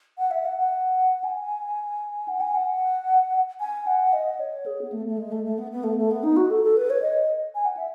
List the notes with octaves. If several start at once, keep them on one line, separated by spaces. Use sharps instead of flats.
F#5
E5
F#5
F#5
G#5
F#5
G#5
F#5
G#5
F#5
D#5
C#5
G#4
B3
A3
A3
G#3
A3
A3
B3
B3
A3
A3
B3
D#4
F#4
A4
A4
B4
C#5
D#5
G#5
F#5
E5